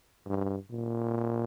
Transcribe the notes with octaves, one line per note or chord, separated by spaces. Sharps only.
G2
A#2